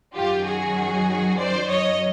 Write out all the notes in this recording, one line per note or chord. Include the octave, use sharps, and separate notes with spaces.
F#2 D#3 F#3 F4 G4
F#4 G#4
C5 D5
C#5 D#5